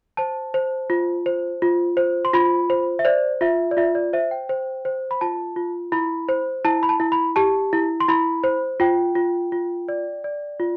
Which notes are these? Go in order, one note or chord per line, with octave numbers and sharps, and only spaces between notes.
C5 A5
C5
F4
C5
F4
C5
C6
F4 B5
C5
E5
C5 D5
F4 E5
D5
F4 E5
D5
C5 E5
G5
C5
C5
B5
F4 A5
F4
E4 B5
C5
E4 A5
B5
A5
E4
B5
G4 A5
E4
C6
E4 B5
C5
F4 G5
F4
F4
D5
D5
F4